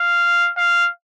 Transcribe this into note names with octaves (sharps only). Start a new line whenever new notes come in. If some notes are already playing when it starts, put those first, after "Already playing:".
Already playing: F5
F5